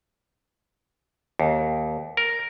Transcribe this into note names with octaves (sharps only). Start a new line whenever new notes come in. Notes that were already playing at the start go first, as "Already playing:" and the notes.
D#2
A#4